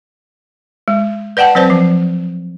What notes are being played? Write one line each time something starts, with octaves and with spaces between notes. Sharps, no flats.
G#3
B4 D5 F#5 G5 A5
F#3 C4 B4 C5 D5
F3